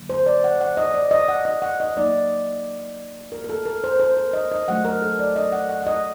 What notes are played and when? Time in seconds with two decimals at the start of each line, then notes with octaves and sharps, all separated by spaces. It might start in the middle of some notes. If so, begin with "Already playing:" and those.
Already playing: D3 F#3 A#3
0.10 C5
0.26 D5
0.44 F#5
0.61 F#5
0.77 D#5
0.94 D5
1.11 D#5
1.29 F#5
1.45 D#5
1.62 F#5
1.80 D#5
1.96 F#3 A#3 D#4 D5
3.32 A#4
3.44 A#4
3.49 A4
3.66 A#4
3.84 C5
4.00 C5
4.17 A#4
4.33 D#5
4.52 D#5
4.68 F#3 A3 D4 F#5
4.85 A#4
5.02 A4
5.19 D5
5.36 D#5
5.52 F#5
5.69 F#5
5.82 F#5
5.87 D#5